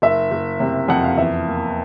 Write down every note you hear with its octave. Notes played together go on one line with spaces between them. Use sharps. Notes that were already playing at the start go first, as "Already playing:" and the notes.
F#1 E5
F#1
C3
F2 F#5
F5
E2 E5
A#3